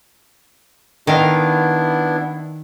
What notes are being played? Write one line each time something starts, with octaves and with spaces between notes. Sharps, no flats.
D#3 B3 D4 E4 F5